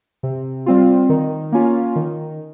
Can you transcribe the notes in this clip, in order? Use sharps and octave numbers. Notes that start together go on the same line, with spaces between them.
C3
G3 C4 F4
D#3
A#3 C#4 F4
D#3